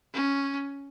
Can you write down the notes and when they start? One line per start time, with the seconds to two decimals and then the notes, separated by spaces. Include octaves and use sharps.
0.14 C#4